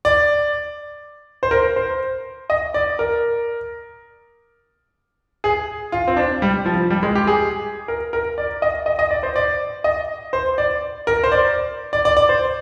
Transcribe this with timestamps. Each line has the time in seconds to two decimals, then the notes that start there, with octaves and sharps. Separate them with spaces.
0.05 D5
1.43 C5
1.51 A#4
1.76 C5
2.50 D#5
2.74 D5
2.99 A#4
5.44 G#4
5.92 F4
6.08 C4
6.17 D4
6.42 G3
6.66 F3
6.90 G3
7.03 G#3
7.15 G4
7.27 G#4
7.88 A#4
8.13 A#4
8.38 D5
8.62 D#5
8.86 D#5
8.99 D#5
9.11 D5
9.23 C5
9.36 D5
9.84 D#5
10.33 C5
10.58 D5
11.07 A#4
11.24 C5
11.32 D5
11.93 D5
12.05 D5
12.17 D5
12.29 C5